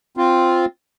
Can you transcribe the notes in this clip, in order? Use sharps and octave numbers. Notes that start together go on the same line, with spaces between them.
C4 F4